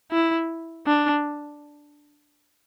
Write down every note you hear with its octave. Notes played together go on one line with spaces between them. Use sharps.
E4
D4